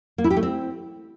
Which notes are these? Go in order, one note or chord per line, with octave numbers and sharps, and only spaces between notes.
A#3
E4
G4
A3
C4